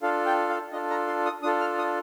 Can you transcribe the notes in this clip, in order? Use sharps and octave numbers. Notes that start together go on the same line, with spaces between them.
D4 F4 A4 F5
G5
F5
D4 F4 A4 D#5
A#5
C6
D#6
D4 F4 A4 D#6
F6
D#6